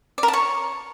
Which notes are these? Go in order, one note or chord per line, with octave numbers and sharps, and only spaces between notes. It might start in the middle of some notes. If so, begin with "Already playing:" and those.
D5
A#4
A5
C#5